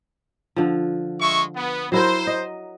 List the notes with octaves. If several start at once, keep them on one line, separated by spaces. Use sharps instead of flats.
D3 F3
G#3 E5 C#6
B3
F#3 E4 A#4 C5
D#5